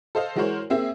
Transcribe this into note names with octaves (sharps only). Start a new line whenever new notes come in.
A4 C5 D#5 F5
E3 G#3 F#4 A#4 C5 C#5
A#3 C4 G#4 E5